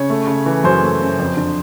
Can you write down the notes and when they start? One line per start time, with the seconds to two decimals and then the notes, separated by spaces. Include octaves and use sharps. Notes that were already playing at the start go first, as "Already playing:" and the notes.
Already playing: C#3 C#5
0.10 A3
0.27 C#3
0.46 E3
0.64 F#2 C5
0.83 A3
1.01 C#3
1.19 F2
1.37 D3